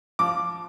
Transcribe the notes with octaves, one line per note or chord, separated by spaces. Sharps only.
F3 D6